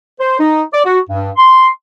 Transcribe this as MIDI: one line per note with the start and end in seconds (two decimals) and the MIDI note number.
0.20 0.40 72
0.40 0.62 63
0.73 0.82 74
0.85 1.00 66
1.09 1.31 43
1.37 1.68 84